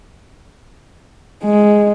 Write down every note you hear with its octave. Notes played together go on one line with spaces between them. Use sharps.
G#3